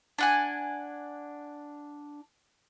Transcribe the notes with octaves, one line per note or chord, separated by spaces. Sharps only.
D4 F#5 G#5